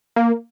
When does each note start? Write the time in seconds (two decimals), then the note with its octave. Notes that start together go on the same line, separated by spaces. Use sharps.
0.16 A#3